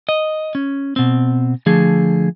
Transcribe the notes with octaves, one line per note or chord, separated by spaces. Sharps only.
D#5
C#4
B2 C4
D3 F3 A3 G#4